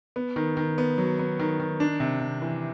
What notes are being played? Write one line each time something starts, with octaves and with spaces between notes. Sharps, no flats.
B3
D#3
D#3
B3
F#3
B3
D#3
D#3
D4
C3
C3
E3